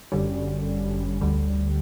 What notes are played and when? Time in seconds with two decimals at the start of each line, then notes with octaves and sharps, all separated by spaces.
0.12 G1 F#2 D3 G3 C#4
1.21 D2 D3 G3